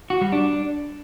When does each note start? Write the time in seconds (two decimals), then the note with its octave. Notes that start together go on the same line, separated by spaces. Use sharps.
0.10 F#4
0.21 G3
0.33 D4